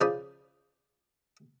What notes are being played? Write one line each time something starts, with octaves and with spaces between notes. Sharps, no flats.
C#3 F3 C5 D5 B5 D#6